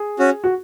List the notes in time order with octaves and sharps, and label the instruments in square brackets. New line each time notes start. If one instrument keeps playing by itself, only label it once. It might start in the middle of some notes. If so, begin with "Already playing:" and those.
Already playing: [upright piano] G#4
[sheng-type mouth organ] C#4 F#4
[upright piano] F#4